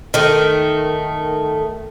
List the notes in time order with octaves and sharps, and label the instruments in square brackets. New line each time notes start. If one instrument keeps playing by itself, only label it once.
[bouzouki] D#3 A3